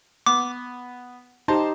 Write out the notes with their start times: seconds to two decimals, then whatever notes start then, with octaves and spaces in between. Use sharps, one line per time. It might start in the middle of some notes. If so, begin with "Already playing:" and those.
0.26 B3 D6
1.48 D#4 G4 C5 A5 A#5